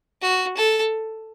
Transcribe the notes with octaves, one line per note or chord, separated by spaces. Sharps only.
F#4
A4